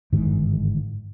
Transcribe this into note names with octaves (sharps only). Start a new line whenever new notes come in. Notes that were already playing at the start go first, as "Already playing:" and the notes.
G1 G#2 D#3 E3